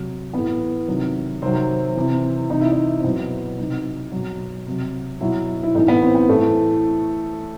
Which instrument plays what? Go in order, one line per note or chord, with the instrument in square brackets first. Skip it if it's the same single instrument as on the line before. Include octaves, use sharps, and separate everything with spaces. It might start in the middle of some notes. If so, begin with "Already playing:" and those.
Already playing: [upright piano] C3 F#3
A2 E3 B3
C3 D#3 F#3
C3 D#3 F#3 C4
C3 E3
C3 E3 D#4
E4
D#4
C4
B2 F#3 B3
C3 F#3 D#4
B2 F#3
C3 F#3
B2 F#3 E4
E4
A2 D#4
E3
B3
C4
B3
A2 E3 A3